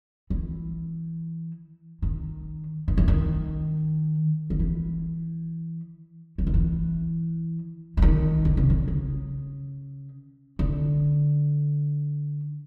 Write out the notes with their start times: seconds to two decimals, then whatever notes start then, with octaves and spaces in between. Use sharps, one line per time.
0.30 E3
2.02 D#3
2.88 D#3
2.97 E3
3.08 D#3
4.50 D#3
4.59 E3
6.38 E3
6.47 D#3
6.54 E3
7.97 E3
8.02 D#3
8.45 D3
8.57 C#3
8.70 D3
8.88 C#3
10.59 D3